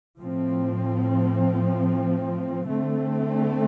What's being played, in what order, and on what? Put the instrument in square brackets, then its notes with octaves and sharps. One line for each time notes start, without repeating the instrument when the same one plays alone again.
[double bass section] A2 F3 C4
D3 A3 C4